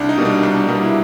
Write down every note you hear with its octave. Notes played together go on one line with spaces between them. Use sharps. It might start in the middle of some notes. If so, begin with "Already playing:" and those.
Already playing: C2 D4
D#4
B2 G3 A#3
D4
C2 D4
B2 G3 A#3
E4